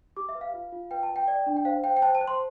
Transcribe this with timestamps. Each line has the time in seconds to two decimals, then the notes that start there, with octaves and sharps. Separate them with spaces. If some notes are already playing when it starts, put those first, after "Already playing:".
0.17 G4 D6
0.29 E5
0.35 B4
0.41 F5
0.54 F4
0.72 F4
0.91 B4 G5
1.03 A5
1.09 B4
1.16 G5
1.28 D5
1.46 D4
1.57 G5
1.65 C5 F5
1.84 C5 G5
1.97 G5
2.02 C5 A5
2.15 A5
2.21 C5
2.28 C6